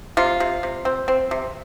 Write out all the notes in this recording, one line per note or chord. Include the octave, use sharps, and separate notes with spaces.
C3 F4
C3
C3
C4
C4
C3